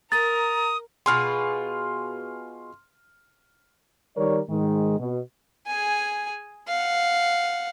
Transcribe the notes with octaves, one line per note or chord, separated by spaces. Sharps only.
A#4 A#5 D#6 A6
B2 F4 G#4 C6 F6
D#3 G3 A#4 C#5 D5
G#2 D#3 G#3
B2
G#4 G#5
F5 F#5